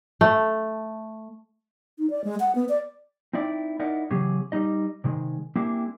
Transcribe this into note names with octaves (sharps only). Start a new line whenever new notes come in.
A3
D#4
D5
G#3
F#5
B3
D5
C4 D#4 E4 D5 G5
D#4 E4 A#4 D5 D#5 F#5
C#3 E3 F#3 C4 G4 G#4
G3 D#4 D#5
C3 D#3 G#3
G#3 A#3 C4 D4 E4 G4